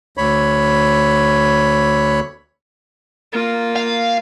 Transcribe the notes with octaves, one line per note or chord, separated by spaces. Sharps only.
D2 C#5 B5
A#3 F4
F5